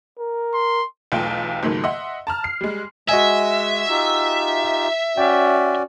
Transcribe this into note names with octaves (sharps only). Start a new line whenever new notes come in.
A#4
C6
B1 E2 A3 F4 G5
C#2 G#2 D#3 F#3 A3 A#3
D#5 E5 F#5 C6
A5 A#5 F6
C7
G3 G#3
G#3 F#4 D#5 E5 G#5
D#4 F4 G4
C#4 F#4 D5 G5